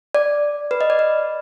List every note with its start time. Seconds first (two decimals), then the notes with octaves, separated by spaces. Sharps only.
0.15 D5
0.71 B4
0.81 D#5
0.90 D5
0.99 B4